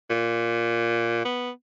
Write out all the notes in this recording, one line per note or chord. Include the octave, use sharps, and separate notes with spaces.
A#2
B3